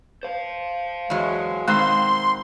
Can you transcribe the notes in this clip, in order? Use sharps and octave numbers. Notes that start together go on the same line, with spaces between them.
C5 F5
E2 F#3 G#3
B2 D#3 G#3 C4 C6